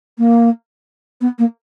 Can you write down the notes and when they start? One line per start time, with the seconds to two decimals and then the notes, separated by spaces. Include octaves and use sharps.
0.18 A#3
1.21 B3
1.38 A#3